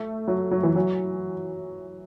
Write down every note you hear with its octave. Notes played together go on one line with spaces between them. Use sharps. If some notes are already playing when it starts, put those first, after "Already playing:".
Already playing: A3
F#3
F#3
E3
F#3